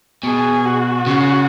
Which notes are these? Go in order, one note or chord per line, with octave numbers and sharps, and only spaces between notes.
B2 G#4
F#4
C#3